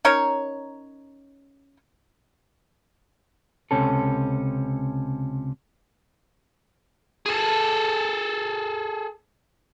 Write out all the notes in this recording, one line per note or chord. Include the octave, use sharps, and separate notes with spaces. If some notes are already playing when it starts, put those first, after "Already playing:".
C#4 D#4 A#4 C#5
C#2 C3 C#4 A4
G#4 A4